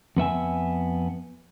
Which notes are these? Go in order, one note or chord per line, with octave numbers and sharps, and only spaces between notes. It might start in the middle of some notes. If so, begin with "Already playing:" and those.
F2 B3 E5 G#5